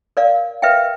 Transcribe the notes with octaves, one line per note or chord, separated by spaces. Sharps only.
A#4 D5 F5
A#4 B4 E5 F5 G5